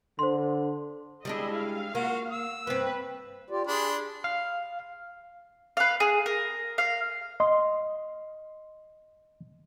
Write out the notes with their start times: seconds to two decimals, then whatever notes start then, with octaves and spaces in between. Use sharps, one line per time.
0.19 D3 C5 C6
1.25 G3 G#3 D4 E4 G#4 D#5
1.56 F5
1.95 A#3 F4 F#4
2.31 E6
2.67 G2 C4 B4
3.50 F4 G4 D5
3.67 D4 G#4 B5 C6
4.24 F5
5.77 B4 F5
6.00 G#4
6.26 A#4
6.78 F5
7.40 D#5 C6